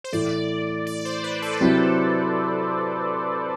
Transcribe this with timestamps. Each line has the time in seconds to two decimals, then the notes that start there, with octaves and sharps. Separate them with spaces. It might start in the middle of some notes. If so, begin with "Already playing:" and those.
0.04 C5
0.12 A2 E3 A3 E4 D5
0.87 D5
1.05 C5
1.24 B4
1.42 A4
1.60 C3 F#3 C4 E4